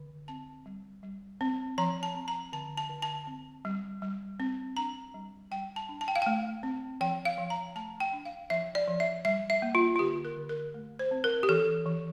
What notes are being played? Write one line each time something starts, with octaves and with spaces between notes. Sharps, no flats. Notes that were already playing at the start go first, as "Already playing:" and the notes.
Already playing: D3
C4 A5
G3
G3
C4
F3 A#5
A5
C4
A#5
D3 A5
A5
D3
A5
C4
G3
G3
C4
D4 A#5
G3
G3 G5
A5
D4
A5
G5
F5
A3 G5
C4
F3 G5
F5
F3
A#5
A3 A5
G5
D4
F5
F3 E5
D5
F3
E5
G3 E5
E5
A#3
F4
F4
D3 G4
A#4
D3
A#4
A3
C5
C4
A#4
G4
E3 A4
E3